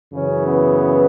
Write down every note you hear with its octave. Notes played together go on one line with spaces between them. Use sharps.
F#2 C#3 E3 C#4
B3